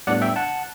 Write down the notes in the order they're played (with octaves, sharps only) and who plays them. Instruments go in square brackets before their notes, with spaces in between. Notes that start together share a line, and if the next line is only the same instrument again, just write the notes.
[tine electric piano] A2 G3 B3 D4 D5 F#5
E5 G5
F#5 A5